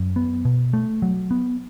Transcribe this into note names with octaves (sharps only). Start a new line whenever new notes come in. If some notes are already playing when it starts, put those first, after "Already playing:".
Already playing: F#2
B3
B2
A3
F#3
B3